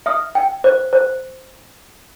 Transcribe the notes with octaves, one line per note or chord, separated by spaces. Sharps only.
E5 D#6 F6
G5
C5
C5